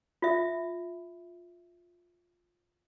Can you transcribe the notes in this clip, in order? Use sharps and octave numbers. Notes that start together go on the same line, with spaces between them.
F4 E5